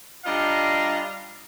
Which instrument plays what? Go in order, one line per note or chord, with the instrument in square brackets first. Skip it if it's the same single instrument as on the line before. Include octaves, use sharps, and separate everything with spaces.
[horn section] G3 D4 F4 D#5 F5 A#5